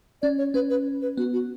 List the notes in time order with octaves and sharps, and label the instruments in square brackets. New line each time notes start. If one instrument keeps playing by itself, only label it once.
[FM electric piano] C#4 [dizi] D5
[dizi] C#5
[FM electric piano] C#4 [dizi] B4
[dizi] B4
B4
[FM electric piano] B3 [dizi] F#4
[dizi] F#4